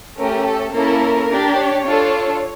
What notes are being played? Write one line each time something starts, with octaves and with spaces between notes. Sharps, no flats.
A3 C#4 G4 A#4
A4
A#3 C#4 E4 A4 A#4
D4 G4
C#5
D4 F4 A4